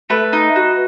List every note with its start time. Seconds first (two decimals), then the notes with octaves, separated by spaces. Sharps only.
0.10 A3 B4
0.33 D#4
0.56 F#4